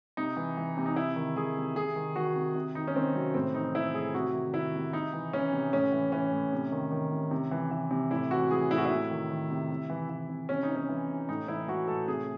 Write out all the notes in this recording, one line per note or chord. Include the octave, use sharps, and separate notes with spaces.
C3 D#4
E3
E3
C3
D#4
C3 E4
D#3
D#3 G#4
C3
C3 G#4
D#3
D#3 F#4
C3
C3
D#3 D#4
C#4
D#3 C4
C3 F#3
A2 C4
E3 D#4
E3 E4
A2 G#4
C3 F#4
D#3
D#3 E4
C3
C3 D#4
E3
E3 C#4
C3
A2 C#4
E3
E3 C#4
A2
C3
D#3
D#3
C3
C3
E3
E3
C3
A2 E4
E3 F#4
E3 G#4
A2 E4
F#4
E4
C3
D#3
D#3
C3
C3
E3
E3
C3
C3 C#4
D#4
E3
C#4
E3
C3
A2 D#4
E3 E4
E3 F#4
A2 A4
C3 G#4